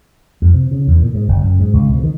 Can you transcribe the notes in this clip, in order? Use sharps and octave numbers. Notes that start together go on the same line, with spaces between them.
F2
C3
C#3
E2
A#2
G#2
F#1
F#2
G#2
C#2
C3
D#3